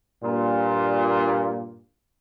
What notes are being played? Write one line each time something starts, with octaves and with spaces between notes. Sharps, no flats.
G2 A#2